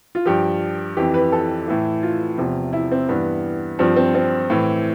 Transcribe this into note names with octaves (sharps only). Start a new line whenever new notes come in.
F4
G2 F3 G4
F2 E3 G4
B4
A4
A2 E3
F4
E2 C3 F3
E4
C4
G2 E3 B3
G2 F3 C4
C4
C4
A2 E3